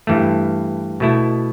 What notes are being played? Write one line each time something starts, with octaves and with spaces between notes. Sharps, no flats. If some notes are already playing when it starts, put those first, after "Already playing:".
G2 E3 A3
B2 A3 E4